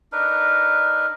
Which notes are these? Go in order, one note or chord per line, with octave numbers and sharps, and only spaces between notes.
D4 D#4 A#4 B4